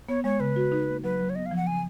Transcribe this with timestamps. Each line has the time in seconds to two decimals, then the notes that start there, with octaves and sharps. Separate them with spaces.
0.09 B3 C#5
0.24 G#3 C#5
0.40 C#3 B4
0.56 F#4
0.72 D#4
0.88 A#3
1.04 F#3 B4
1.20 F#3
1.30 C#5
1.35 B3 D#5
1.46 F5
1.51 F3
1.56 F#5
1.67 C#3 G#5